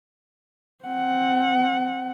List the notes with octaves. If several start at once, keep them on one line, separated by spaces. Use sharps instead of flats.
C4 F#5